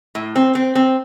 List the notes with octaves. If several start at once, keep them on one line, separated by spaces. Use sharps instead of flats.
A2
C4
C4
C4